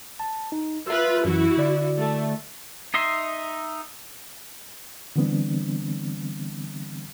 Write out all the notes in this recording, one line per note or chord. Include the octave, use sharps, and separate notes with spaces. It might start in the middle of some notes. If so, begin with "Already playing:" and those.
A5
D#4
F4 B4 E5 E6
F#2 E3 E4 F#4
D3 D5
A3
D#4 D#5 E5 C6
D3 E3 G3 B3 C4 D4